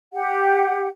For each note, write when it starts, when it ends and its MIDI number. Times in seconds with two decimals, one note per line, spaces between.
0.14 0.88 67
0.14 0.88 78